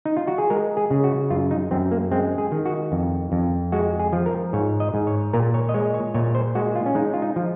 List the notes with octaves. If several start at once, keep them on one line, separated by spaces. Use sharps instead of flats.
D#4
F4
F#4
G#4
G#3 A#4
G#4
C#3
F#4
F#2 F4
D#4
F#2 C4
A#3
G#3 C4
G#4
D#3
F#4
F2
F2
G#3 F#4
G#4
F3
A#4
G#2 C#5
D#5
G#2
C#5
A#2 A#4
C#5
D#5
G#3 C#5
C#5
A#2 C#5
C5
G#3 F#4
F4
C#4
G#3 D#4
F4
D#4
F3